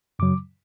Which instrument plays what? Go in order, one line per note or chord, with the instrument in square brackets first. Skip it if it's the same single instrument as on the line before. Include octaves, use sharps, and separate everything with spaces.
[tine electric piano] F#2 C#3 F#3 D6